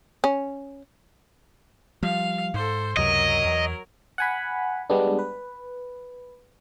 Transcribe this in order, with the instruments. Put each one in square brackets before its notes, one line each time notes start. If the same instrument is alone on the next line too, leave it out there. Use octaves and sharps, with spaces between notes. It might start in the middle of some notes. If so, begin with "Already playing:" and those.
[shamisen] C#4
[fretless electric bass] F3 G3 [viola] F5
[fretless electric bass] G#2 [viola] A4 C5
[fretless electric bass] C#2 F#2 C3 [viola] F#3 A#4 [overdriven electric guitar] D#5
[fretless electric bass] E2
[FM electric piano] F#5 G#5 B5
G3 G#3 B3 D4
B4